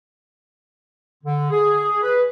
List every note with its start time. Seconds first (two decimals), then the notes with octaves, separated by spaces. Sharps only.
1.24 D3
1.51 G#4
2.02 B4